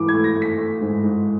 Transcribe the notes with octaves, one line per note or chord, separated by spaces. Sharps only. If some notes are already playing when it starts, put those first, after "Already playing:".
Already playing: G#2 E3 A3 B5 D6
G#6
A3
A#6
A3
B6
A3
G#2
G#2